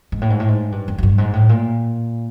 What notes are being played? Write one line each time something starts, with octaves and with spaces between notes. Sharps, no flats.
G#2
A2
G#2
A2
G#2
G2
F#2
F#2
G2
G#2
A2
A#2